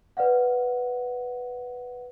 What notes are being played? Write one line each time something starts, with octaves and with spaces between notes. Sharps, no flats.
B4 D5 F5 F#5